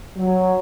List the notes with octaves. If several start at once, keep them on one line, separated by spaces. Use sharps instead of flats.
F#3